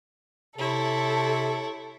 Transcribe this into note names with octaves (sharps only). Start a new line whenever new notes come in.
C3 E4 A4 C#5